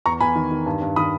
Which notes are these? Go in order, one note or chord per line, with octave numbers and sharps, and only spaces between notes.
E2 A#5 C#6
E2 G#5 B5
D#3
D#3
G2
G2
D#3 B5 D#6